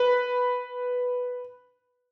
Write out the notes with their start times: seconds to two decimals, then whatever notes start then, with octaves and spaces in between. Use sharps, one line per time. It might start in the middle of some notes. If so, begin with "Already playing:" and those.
Already playing: B4